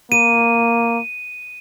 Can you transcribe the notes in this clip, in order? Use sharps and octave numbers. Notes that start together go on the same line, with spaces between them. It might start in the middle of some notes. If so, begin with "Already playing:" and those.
A#3 D#7